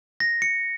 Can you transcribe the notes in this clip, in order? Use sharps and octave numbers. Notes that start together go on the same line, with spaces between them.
A#6
C#7